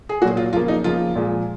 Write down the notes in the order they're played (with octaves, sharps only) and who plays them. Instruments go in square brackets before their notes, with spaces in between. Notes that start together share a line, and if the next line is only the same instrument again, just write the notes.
[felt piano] G#4
A#2 F#3 A#3 F#4
F4
C#3 F3 A#3 F4
D#4
C#3 F3 A#3 F4
A#2 F3 G#3